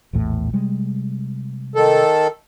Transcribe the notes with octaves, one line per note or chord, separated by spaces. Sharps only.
A#1 E2 A2
C3 G3 G#3
D#3 A4